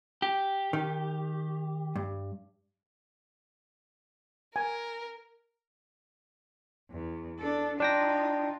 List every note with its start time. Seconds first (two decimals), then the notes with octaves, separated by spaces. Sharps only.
0.22 G4
0.73 D#3
1.96 G2
4.56 A#4 G#5
6.91 E2
7.39 D4 A4
7.80 D4 D#4 F4 G5 A#6